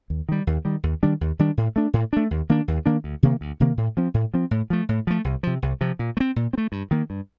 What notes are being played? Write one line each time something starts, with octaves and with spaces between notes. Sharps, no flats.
D#2
D#3 G3
D#2
D#3 G3
D#2
D#3 G3 D4
D#2
D#3 G3 D4
A2
A3 D4
A2
A3 D4
D#2
D#3 A#3 D4
D#2
D#3 A#3 D4
D2
C3 D#3 A#3
D2
C3 D#3 A#3
A2
F3 C4
A2
F3 C4
A2
F3 A3
A2
F3 A3
C2
C3 F3
C2
C3 F3
A#2
A3
C4
A#2
C4
A3
G2
D#3 A#3
G2